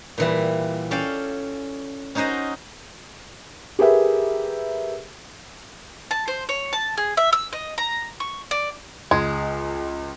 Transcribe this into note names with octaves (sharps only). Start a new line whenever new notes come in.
A#2 E3 G3
C#4 A4 D5 F5 G5
C#4 D#4 F#4 C5 D#5
G4 G#4 A#4 B4 E5
A5
C5
C#5
A5
G#4
E5
E6
D#5
A#5
C#6
D5
C#2 G#3